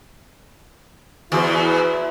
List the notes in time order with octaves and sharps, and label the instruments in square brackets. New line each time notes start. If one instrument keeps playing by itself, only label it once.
[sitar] E2 [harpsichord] F#3 C4 [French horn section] E4